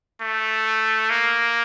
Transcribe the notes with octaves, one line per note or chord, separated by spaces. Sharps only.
A3
A#3